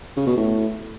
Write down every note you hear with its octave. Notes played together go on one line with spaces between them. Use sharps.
C#3
B2
A2